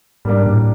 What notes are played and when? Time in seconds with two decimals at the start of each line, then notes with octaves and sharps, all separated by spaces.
0.25 G#2 G3 A#3 D4
0.47 A2